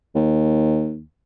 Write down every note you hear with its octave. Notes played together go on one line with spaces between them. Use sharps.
D#2